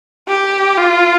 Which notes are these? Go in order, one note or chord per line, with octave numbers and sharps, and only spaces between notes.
G4
F4